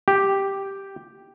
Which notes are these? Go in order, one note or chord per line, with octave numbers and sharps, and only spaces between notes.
G4